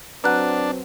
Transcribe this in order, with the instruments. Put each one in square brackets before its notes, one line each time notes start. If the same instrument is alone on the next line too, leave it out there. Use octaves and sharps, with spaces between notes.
[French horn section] F#3 C4 [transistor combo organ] D4 [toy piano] B4 F#5 A5 [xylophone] A#5 F#6